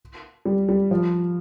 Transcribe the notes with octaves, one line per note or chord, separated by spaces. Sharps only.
G3
G3
F3